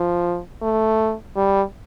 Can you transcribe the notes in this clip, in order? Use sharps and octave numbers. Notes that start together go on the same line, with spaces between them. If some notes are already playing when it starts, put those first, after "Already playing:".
Already playing: F3
A3
G3